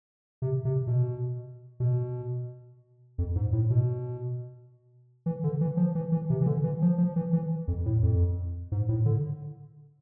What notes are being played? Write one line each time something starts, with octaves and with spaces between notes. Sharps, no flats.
C3
C3
B2
B2
F2
G#2
A2
B2
E3
D3
E3
F3
E3
E3
C3
E3
D3
E3
F3
F3
E3
E3
F2
A2
F2
G#2
A2
D3